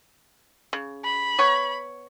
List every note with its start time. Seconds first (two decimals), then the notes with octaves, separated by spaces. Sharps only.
0.73 C#3
1.05 B5
1.39 B3 C#5